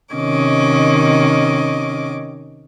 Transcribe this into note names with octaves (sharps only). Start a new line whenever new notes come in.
C3 D#3 C#4 D#5 D6